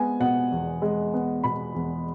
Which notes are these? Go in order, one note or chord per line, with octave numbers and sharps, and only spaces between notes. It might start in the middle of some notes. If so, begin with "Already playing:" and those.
Already playing: G#3 B3 G#5
B2 F#5
E2
G#3
B3
B2 B5
E2